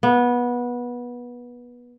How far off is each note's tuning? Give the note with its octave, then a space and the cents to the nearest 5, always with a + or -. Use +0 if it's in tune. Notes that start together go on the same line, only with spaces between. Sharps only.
B3 -20